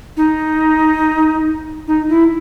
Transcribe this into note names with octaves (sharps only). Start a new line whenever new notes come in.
D#4
D#4
E4